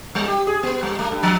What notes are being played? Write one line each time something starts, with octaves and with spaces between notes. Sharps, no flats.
G3
G4
G#4
B3
G3
A3
G2
F3